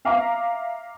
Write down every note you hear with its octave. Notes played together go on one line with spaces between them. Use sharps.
E5 F5 A#5 D6